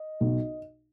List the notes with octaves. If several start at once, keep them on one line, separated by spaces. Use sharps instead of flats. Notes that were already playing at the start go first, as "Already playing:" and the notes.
Already playing: D#5
B1